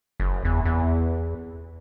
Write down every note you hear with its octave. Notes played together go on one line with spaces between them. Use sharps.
F#1
E2
E2